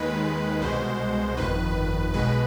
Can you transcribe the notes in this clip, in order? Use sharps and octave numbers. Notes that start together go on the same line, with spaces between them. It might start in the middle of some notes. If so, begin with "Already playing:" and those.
Already playing: D#2 D#3 G#3 B4
C2 B2 G#3 C5
G1 F2 D#3 B4
B1 B2 G#3 B4